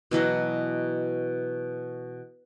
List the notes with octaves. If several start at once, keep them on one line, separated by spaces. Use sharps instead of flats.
B2 E3 F#3 D#5